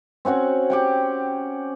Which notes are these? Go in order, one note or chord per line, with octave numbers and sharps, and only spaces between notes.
C4 C#4 F#4 F#5
G4 F#5 G5